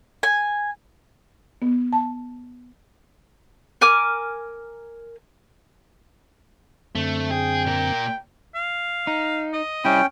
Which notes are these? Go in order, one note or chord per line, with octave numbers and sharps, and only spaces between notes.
G#5
B3
A5
A#4 G#5 D6 F6
F#2 D3 A3 C4
G#4 G5
A#2 A#4
F5
D#4
D#5
G3 C#4 E4 G5